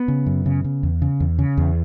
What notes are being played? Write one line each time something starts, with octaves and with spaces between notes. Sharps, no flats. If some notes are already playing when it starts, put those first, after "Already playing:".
Already playing: B3
C#3
F#2
C#3
C#3
E2
C#3
E2
C#3
E2